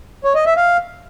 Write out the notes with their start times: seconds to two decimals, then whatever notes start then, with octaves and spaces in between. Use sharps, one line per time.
0.24 C#5
0.35 D#5
0.46 E5
0.57 F5